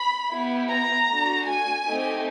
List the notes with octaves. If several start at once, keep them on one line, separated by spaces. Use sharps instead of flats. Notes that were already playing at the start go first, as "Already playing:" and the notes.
Already playing: B5
B3 E4 G4
A#5
A3 D4 F#4
G#5
A3 C4 D#4 G4